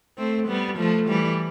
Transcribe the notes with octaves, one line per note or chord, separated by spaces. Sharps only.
A3 C4
G3 B3
F3 A3
E3 G3